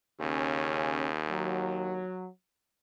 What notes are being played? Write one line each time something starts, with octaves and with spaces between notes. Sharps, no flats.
D#2 C#3 C#4
F#3